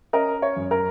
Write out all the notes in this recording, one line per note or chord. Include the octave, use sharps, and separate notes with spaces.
C#4 A#4 D#5
C#5
F#2
A#4